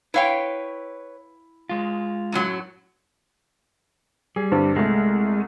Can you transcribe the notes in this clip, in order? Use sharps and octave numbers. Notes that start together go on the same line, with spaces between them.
E4 B4 C#5 F5 G5
G#3 F4
F#2 A2 F#3
G3 G#4
G2 D3 C4
C2 G#3 A3